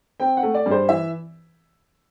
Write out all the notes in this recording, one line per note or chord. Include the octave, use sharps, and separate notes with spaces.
C4 G5
F#5
A3
D5
G2
C5
E3 E5